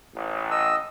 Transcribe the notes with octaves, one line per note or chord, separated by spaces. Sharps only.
A1
D#5 E6